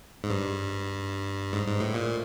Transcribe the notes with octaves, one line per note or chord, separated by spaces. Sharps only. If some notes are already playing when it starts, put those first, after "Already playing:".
G#2
G2
G#2
G#2
A2
A#2